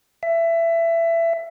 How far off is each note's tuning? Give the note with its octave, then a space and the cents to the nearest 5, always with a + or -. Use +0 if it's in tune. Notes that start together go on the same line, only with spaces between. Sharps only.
E5 +20